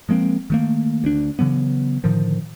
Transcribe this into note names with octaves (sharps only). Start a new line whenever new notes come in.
F3 G#3 A#3 C4
D#3 A3 A#3
D2 D4
C#3 E3 F#3 B3
A2 D3 D#3 F3